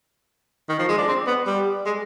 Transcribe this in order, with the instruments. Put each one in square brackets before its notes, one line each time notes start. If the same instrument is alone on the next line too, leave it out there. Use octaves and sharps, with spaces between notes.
[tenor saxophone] D#3
F3
G#3
D4
C4
B3
G3
G#3